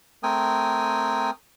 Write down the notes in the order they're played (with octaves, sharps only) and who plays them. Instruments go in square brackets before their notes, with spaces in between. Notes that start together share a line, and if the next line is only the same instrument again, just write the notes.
[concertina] A3 C4 A#4 G5 G#5 D#6